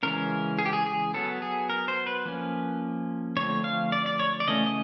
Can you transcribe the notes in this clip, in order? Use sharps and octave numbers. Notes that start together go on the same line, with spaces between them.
C#3 E3 G#3 C#4 A#4
G#4
G4
G#4
G#4
F#3 B3 A4
G#4
A#4
C5
B4
F3 A#3 C#4
D3 F3 A3 C4 C#5
F5
D5
D5
C#5
D5
C#3 E3 A3 C#4 D#5
D#5